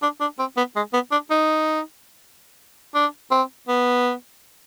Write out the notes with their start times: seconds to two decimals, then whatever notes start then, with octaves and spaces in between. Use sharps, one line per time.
0.03 D4
0.21 D4
0.39 C4
0.57 B3
0.76 G#3
0.94 B3
1.12 D4
1.31 D#4
2.95 D4
3.31 C4
3.68 B3